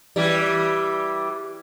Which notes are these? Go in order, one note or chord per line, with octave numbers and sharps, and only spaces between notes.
E3 G3